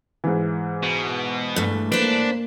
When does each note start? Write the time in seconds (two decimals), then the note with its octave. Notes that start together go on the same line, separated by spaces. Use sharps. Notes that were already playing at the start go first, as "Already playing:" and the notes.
0.24 G#2 E3
0.83 B2
1.56 G2 A3
1.92 A#3 D4 B4 C5